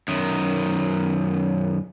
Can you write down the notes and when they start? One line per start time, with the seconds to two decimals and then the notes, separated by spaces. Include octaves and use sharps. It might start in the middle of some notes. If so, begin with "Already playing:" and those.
0.08 F#2 D#3